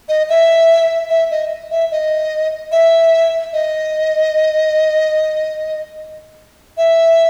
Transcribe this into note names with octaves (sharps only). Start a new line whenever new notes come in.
D#5
E5
E5
D#5
E5
D#5
E5
D#5
E5